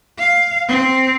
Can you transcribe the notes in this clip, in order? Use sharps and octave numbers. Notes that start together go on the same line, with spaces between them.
F5
C4